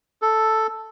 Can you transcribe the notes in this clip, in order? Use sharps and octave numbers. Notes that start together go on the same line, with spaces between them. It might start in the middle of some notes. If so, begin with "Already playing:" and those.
A4